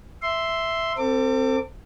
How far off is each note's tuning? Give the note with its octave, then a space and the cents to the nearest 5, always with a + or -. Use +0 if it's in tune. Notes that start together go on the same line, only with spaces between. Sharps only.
E5 +0 C6 +0
C4 +0 A4 +40 D6 +0